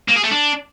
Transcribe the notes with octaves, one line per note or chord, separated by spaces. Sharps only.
A#3
G#4
A3
D4